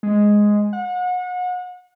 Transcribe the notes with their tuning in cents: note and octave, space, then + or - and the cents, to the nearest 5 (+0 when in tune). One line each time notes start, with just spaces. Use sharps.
G#3 +0
F#5 -35